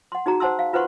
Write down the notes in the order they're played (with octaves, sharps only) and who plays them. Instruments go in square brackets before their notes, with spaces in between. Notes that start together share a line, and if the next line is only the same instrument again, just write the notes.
[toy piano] F#5 C6
D#4 F#4 G#4 A#5
C5 F#5 A5 C6 E6
F5
F4 B4 C5 F#5 C6 C#6